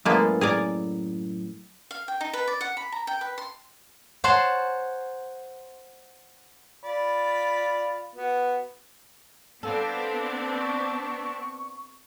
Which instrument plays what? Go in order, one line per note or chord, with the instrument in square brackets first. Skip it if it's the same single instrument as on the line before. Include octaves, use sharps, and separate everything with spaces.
[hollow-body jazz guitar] F#2 A2 A4 [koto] G#3 A#3 B3
[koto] G#4 A#4 D5
[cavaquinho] F5
G5
D#4
B4
D5
F#5
B5
A#5
G5
B4
C6
[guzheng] C5 C#5 F#5 A5 C6
[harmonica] F4 D5 B5
B3 F#4
[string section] B3 C4 D4 [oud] A4 [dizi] F5
[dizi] C#6